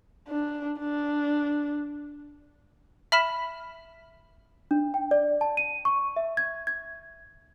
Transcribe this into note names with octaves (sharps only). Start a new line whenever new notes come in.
D4
D4
E5 B5 F6 B6 E7
D4
G5
D5
A5
D#7
C#6
E5
G#6
G#6